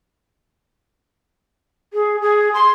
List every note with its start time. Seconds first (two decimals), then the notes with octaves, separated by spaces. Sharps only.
1.93 G#4
2.21 G#4
2.54 C6